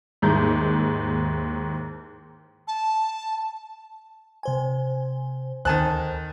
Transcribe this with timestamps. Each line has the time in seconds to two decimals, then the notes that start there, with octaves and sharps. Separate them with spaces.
0.22 D#2 G#2 E4 A#5 G6
2.67 A5
4.43 C3 C5 G#5
5.65 D2 D#3 C5 G#5 A5 F#6